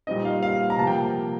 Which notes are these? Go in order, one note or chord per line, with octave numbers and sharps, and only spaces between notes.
A#2 G3 C4 D#4 D#5
F5
F5
A#5
C3 F3 A#3 A5
G5